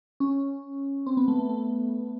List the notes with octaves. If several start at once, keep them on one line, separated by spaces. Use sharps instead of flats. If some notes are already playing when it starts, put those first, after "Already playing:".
C#4
C4
B3
A3
A3
A3